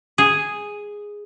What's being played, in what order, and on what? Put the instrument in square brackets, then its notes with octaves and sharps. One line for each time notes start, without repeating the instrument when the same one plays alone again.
[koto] G#4